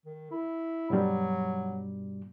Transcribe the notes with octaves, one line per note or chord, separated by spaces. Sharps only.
D#3
E4
G2 B2 F#3 G3